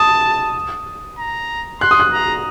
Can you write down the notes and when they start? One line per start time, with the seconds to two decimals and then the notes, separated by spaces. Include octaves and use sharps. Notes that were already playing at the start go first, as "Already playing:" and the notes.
Already playing: A5 D#6
1.18 A#5
1.81 C6 F#6
1.91 D#6
2.00 F#6
2.13 A#5